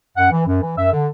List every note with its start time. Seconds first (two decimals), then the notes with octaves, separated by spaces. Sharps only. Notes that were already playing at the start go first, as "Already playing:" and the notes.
0.16 F#2 F#5
0.31 E3
0.47 F#2
0.62 E3
0.77 F#2 E5
0.92 D3